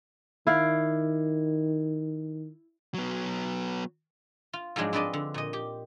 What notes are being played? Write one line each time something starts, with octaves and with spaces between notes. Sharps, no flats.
D#3 E4 D5 F5
F#3 B3
F4
G#2 F3 F#3 G#3 D4
C4 D4 B4 D5 D#5 A5
D3
A#2 D#5
G4